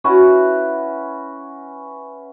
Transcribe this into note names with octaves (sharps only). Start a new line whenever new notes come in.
C#4 E4 F#4 B4